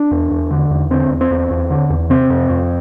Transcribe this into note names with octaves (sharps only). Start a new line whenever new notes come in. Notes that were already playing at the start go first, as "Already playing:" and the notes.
Already playing: D4
E2
E2
D3
E2
D3 C4
E2
C4
E2
E2
D3
E2
C3 C4
F2
F2